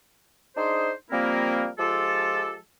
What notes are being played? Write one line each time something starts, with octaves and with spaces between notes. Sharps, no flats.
D4 D#4 G#4 C5
F3 G3 A#3 C4 E4 A#4
F3 G#3 F4 G4 A4